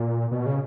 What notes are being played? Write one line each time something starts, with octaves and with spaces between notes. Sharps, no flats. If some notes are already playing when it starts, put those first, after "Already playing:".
Already playing: A#2
B2
C#3